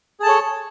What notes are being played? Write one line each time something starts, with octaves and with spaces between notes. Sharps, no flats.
G#4 A4 C#5 A5